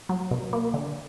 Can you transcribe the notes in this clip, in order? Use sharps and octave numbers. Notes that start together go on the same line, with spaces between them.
F#3
B2
A#3
D3